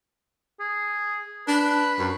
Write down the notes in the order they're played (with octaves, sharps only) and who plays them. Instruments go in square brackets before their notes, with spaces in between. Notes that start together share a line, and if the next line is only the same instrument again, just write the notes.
[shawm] G#4
[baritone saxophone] D4 [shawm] B4
[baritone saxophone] F#2